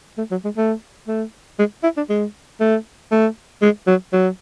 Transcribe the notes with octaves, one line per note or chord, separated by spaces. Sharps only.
A3
F#3
G#3
A3
A3
G#3
E4
D4
G#3
A3
A3
G#3
F#3
F#3